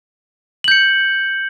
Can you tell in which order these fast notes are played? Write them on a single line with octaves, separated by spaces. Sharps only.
F#7 G6 C#7